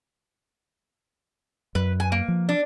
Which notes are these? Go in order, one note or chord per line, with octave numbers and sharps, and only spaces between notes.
F#2 B4
G#5
A#3
F3
D4